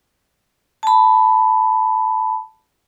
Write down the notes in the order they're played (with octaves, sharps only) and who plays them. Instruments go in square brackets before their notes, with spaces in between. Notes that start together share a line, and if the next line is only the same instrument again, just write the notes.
[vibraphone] A5 B5